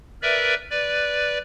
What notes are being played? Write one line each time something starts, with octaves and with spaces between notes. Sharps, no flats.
A#4 B4 D5 E5
B4 D5